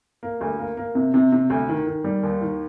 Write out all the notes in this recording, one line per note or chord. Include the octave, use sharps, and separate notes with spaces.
A#3
D2
A#3
A#3
C3
C3
C3
D2
D#3
D#3
G3
D#2
D#3